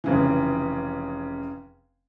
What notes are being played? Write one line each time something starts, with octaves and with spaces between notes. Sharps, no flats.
F1 C#3 E3